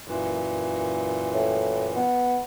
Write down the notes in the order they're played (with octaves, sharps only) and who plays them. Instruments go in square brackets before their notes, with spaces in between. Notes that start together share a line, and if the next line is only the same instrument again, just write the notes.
[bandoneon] F#2 A#2 E3
[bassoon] A2
B3